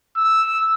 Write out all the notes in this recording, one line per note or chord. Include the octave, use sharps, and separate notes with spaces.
E6